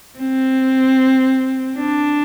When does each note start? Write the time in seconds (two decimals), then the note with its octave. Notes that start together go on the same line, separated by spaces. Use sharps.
0.19 C4
1.77 D4